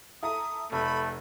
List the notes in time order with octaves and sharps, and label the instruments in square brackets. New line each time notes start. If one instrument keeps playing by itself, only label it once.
[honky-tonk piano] E4 A4 A#5 [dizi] D#6
[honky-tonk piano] F1 [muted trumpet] A3 [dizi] B5